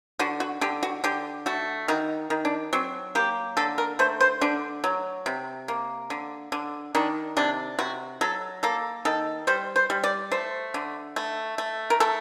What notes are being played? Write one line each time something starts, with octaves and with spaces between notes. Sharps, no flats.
D3 F#4
F#4
D3 G4
F#4
D3 G4
A3 F#4
D#3 F#4
D#3
D4
F#3 C4
A#3 G4
D3 A4
A#4
A3 C5
C5
D3 D4
F#3
C3
A#3
D3
D3
D#3 D4
C3 D4
C3 F#4
F#3 A4
A#3 A4
D#3 A4
G3 C5
C5
G3
D5
A3 C5
D3
A3
A3
A#4
A3 A4